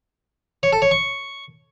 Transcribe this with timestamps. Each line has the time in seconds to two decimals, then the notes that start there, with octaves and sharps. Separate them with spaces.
0.63 C#5
0.73 A4
0.82 C#5
0.91 C#6